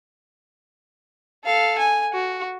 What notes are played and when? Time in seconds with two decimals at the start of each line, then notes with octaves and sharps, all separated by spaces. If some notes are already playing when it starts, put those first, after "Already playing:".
1.44 A4 F5
1.78 G#5
2.13 F#4